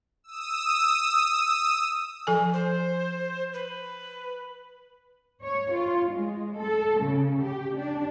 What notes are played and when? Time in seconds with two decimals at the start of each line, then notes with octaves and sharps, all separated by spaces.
0.24 D#6 E6
2.27 F3 A4 G#5
2.53 C5
3.54 B4
5.43 C#5
5.75 F4
6.13 G#3
6.62 A4
7.00 C#3
7.43 G4
7.78 D4